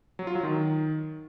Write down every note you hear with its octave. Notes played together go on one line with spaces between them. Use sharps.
F#3
F4
F#3
D#3